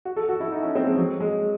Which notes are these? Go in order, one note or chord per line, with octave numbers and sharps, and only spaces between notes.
F#4
A4
F#4
E4
D#4
C#4
C4
G#3
F#3
G#3